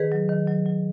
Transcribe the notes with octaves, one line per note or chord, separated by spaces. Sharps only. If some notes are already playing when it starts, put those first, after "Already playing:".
Already playing: D#3 G#4 B4
F#3
D#3
F#3
F#3